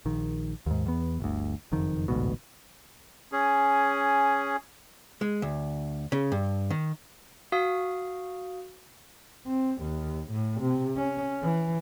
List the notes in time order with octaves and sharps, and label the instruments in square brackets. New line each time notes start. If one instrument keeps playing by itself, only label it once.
[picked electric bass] A#1 D#3
D#2 G#2
E2 B3
G1 D2
F#1 F2 D#3
A1 D2 G#2 B2
[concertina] C#4 G#4
[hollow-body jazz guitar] G#3
D2
C#3
G2
D#3
[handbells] F#4 F5 D#6
[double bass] C4
D#2
A2
C3
C#4
E3